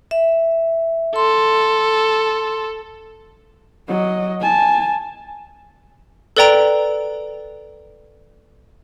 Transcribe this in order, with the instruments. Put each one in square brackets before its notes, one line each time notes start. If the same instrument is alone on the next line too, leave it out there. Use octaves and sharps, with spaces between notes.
[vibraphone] E5
[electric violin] A4 [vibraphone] C6
[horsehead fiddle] F#3 D#5
G#5 A5
[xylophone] A4 B4 D5 G5 A#5 D7